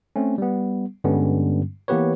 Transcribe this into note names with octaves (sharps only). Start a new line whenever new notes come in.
A3 C4 C#4
G3 B3
G2 D3 G3 G#3 B3 C#4
E3 A#3 B3 G4 B4 C#5